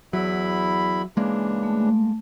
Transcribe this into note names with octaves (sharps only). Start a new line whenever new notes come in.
E2 F#3 E4 B5
C#3 E3 G#3 A#3 D4
A3